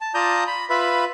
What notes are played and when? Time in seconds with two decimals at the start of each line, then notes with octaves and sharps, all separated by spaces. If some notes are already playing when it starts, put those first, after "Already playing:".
0.01 A5
0.14 F4 D5 A5 A#5 D#6 G6
0.47 B5
0.70 F4 B4 E5 B5